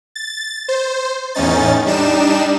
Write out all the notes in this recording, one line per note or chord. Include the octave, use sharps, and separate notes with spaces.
A6
C5
E2 A2 C#4 D#4 A6
G3 D4 D#4 E7